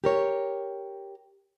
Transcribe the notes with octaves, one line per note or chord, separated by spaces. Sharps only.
G4 A#4 C#5